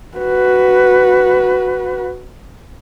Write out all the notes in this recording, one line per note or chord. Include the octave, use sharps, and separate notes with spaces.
F#4 B4